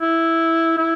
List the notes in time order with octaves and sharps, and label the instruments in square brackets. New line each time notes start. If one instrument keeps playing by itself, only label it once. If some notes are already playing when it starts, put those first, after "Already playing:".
[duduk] E4
E4